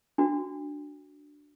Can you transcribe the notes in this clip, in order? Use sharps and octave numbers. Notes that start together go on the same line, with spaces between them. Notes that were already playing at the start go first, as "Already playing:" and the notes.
D4 F#4